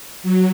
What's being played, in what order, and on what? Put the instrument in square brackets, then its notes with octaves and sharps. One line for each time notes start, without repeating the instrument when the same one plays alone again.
[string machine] F#3